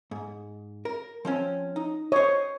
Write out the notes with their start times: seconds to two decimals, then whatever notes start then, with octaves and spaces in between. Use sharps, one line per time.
0.11 G#2
0.85 A#4
1.25 F3 C4 C#4
1.76 D#4
2.12 C5 C#5 D#5